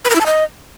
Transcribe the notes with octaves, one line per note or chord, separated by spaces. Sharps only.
B4
A#4
E4
A5
D#5